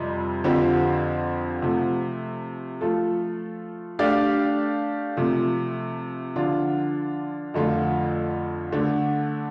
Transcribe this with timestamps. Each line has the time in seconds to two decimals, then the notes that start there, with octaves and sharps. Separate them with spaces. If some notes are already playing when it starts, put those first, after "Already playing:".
Already playing: F2 C3 G3 C4
0.44 F2 D3 F3 C4 G4
1.62 C3 F3 A3
2.81 F3 A3 F4 A4
3.99 A3 D4 G4 D5 F5
5.17 C3 F3 A3
6.36 D3 F3 D4 F4
7.54 F2 D3 F3 A3 F4
8.72 D3 A3 D4